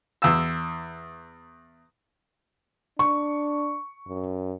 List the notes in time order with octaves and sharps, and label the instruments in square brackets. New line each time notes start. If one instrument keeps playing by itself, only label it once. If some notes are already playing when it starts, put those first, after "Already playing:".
[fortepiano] E2 E6
[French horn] D4 [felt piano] C#6
[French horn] F#2